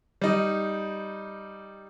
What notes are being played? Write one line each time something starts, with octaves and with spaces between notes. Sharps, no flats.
G3 D#4